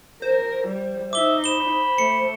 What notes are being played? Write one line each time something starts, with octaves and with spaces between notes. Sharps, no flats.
A#4 C5
G3
D#4 E5 D6 G7
B5 E7 G7
A3 C#7